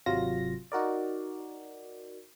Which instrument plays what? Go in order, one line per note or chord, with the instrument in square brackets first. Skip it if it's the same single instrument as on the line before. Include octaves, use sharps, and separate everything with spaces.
[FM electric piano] G#1 C3 F#3 F4 A#6
D#4 F#4 A#4 D5